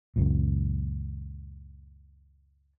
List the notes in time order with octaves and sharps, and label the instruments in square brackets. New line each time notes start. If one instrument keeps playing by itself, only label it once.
[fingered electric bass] C#2 F#2 A#2